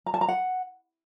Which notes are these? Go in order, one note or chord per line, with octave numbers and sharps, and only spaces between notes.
A#5
A5
A#5
F#5